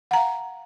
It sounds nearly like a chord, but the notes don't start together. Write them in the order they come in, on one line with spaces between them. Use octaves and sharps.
F#5 A#5 F5